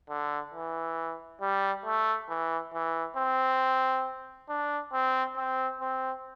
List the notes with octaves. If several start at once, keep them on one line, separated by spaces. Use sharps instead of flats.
D3
E3
G3
A3
E3
E3
C4
D4
C4
C4
C4